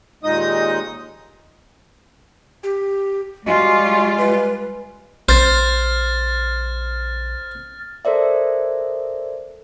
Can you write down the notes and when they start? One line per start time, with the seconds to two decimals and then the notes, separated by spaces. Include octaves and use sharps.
0.24 D#2 A#2 G#3 D#4 D#5 D#6
2.63 G4
3.46 G3 G#3 F4 F#4 D#5 G#5 C6
4.18 B4
5.29 A#1 C5 F6 A6
8.05 A4 A#4 C5 D5 E5